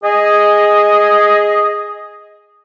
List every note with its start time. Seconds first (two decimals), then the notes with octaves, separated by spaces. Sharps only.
0.04 G#4 D#5